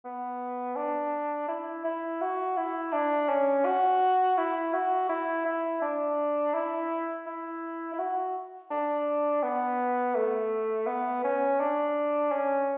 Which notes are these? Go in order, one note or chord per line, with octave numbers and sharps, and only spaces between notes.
B3
D4
E4
E4
F#4
E4
D4
C#4
F#4
E4
F#4
E4
E4
D4
E4
E4
E4
F#4
D4
B3
A3
B3
C#4
D4
C#4